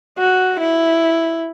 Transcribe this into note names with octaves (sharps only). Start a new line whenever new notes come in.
F#4
E4